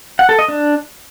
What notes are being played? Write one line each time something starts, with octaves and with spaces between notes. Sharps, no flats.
F#5
A4
D#5
D4